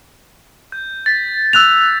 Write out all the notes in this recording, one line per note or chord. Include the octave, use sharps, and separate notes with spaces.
G6
A6 B6
E6 F#6 F7